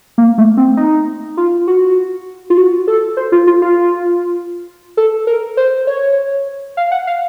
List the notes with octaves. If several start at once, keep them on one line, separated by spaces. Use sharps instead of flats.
A#3
A3
C4
D#4
F4
F#4
F4
F#4
A4
C5
F4
F4
F4
A4
A#4
C5
C#5
F5
F#5
F5